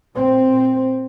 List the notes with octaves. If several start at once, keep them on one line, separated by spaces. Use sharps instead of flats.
A#2 C4
A#2